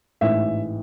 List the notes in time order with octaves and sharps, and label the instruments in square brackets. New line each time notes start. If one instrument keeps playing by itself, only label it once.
[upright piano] A1 G#2 E3 E5